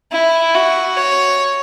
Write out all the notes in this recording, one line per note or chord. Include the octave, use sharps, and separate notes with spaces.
E4
F#4
C#5